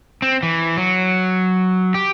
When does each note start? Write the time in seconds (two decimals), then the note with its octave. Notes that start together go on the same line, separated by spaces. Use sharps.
0.22 C4
0.43 E3
0.77 F#3
1.94 G4